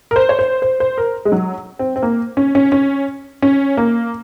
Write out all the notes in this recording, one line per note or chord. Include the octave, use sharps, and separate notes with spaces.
A#4
C5
C#5
C5
C5
C5
A#4
G#3
F#3
C4
C4
A#3
C#4
C#4
C#4
C#4
A#3